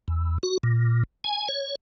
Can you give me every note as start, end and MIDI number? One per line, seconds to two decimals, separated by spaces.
0.08 0.38 40
0.43 0.58 66
0.63 1.03 46
1.24 1.48 80
1.48 1.75 73